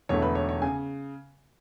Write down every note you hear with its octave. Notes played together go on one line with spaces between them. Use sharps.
E1 E2 D3 A3 C#5
B4
C#5
C#5
C#3 G#5